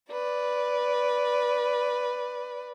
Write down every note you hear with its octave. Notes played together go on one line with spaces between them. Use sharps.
B4 D5